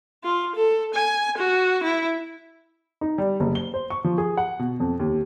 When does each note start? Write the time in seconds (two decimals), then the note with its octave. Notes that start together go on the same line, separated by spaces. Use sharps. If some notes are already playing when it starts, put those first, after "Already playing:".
0.24 F4
0.55 A4
0.94 G#5
1.38 F#4
1.83 E4
3.01 D#4
3.18 G3
3.40 F#1
3.55 G7
3.74 C5
3.90 C#6
4.04 F3
4.18 G#4
4.37 F#5
4.59 B2
4.80 F2
4.99 D#2